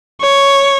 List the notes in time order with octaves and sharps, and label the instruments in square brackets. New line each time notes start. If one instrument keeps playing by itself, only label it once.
[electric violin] C#5